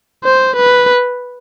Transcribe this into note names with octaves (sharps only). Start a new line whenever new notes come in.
C5
B4